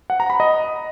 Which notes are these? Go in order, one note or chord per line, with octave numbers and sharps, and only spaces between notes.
F#5
A#5
B5
D#5